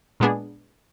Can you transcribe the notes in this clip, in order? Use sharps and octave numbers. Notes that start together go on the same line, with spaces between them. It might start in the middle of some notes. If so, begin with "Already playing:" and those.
A#2 G#3 B3 D4 G#4